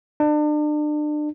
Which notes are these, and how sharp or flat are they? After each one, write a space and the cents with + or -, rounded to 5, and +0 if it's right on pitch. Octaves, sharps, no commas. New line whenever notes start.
D4 +35